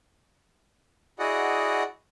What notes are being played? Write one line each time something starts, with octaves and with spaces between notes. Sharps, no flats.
E4 F#4 G#4 D5 D#5 F#5